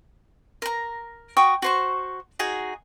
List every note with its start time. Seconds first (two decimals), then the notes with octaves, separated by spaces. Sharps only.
0.62 A#4 A#5
1.37 F#4 G5 C#6 D#6
1.62 F#4 C5 C#6
2.39 D#4 F#4 G#4 G#5